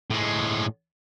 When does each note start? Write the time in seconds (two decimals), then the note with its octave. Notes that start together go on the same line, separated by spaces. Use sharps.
0.11 A2 G#3